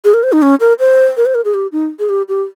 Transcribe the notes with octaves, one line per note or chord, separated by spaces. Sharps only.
G#4
A#4
C5
D#4
C#4
A#4
C5
A#4
C5
A#4
G#4
G4
D#4
G#4
G4
G4